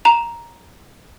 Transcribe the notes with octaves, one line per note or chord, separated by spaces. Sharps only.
A#5 F7